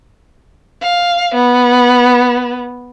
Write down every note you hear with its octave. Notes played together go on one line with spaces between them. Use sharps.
F5
B3